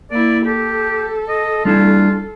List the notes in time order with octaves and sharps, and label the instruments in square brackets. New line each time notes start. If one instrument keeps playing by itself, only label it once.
[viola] A#3 E4 [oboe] D5
[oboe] G4 [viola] A4
[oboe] D#5
[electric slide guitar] G3 D4 E4 [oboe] F4